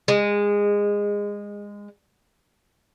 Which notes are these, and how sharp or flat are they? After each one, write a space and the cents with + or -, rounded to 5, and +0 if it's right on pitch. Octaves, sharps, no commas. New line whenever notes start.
G#3 -20